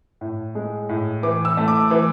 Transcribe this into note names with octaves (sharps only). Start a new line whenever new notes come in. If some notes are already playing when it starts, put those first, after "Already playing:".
A2
G#3
A2
E3 D6
E6
A3
D6
E3 D6